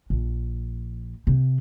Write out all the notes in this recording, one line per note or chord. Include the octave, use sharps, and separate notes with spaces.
A#1
C3